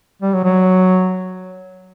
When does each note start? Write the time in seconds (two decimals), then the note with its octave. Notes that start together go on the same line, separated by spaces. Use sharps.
0.22 G3
0.33 F#3
0.44 F#3